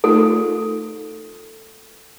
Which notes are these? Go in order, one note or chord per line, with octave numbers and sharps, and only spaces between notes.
A3 D#4 F4 A4